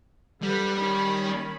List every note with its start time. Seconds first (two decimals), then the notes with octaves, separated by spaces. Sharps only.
0.43 D3 G3 B4 B5
0.75 D#3 C#4 B5